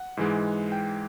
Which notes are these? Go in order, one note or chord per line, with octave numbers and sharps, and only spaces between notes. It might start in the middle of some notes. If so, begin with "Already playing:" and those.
Already playing: F#5
G#2 E3 G#3
G5